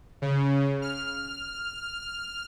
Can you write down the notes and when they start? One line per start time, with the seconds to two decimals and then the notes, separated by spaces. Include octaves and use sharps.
0.22 C#3
0.82 F6